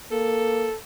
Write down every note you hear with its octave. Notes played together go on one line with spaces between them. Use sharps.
A#3 A4